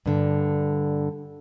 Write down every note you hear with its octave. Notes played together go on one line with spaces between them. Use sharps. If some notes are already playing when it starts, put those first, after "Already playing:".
G2 D3